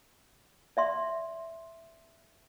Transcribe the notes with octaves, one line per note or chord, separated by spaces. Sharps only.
D5 E5 C6